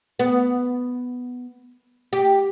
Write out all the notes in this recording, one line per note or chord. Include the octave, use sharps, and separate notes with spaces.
B3
G4